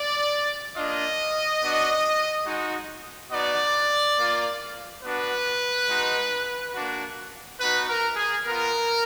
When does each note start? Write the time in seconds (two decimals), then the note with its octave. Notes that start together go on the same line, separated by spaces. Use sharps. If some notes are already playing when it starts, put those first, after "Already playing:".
Already playing: D5
0.75 A#3 D4 F4 D#5
1.60 B3 D4 F#4
2.45 G#3 D#4 F#4
3.31 B3 D#4 F#4 D5
4.17 A#3 F4
5.03 B3 D4 F#4 B4
5.88 G#3 D#4 F#4
6.73 A#3 D4 F#4
7.59 B3 D#4 F#4 B4
7.88 A#4
8.16 G#4
8.45 B3 F4 A#4